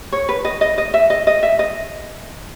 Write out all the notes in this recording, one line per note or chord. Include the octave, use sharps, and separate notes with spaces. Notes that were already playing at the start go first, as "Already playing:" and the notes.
C#5
B4
D#5
D#5
D#5
E5
D#5
D#5
E5
D#5